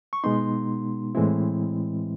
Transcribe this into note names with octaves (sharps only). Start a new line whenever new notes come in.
C#6
B2 G#3 B3 D#4 C6
A2 E3 G#3 C4 E4